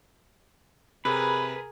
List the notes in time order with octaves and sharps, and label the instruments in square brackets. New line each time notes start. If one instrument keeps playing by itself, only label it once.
[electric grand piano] C3 [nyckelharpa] G#4 A#4 [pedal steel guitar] B4 [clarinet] B5